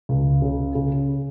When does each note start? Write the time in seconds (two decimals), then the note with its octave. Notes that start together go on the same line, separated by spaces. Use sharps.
0.09 C#2
0.42 C#3
0.75 C#3